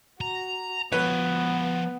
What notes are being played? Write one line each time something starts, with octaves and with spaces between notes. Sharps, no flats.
F#4 A#5
F3 B3 B4 C#5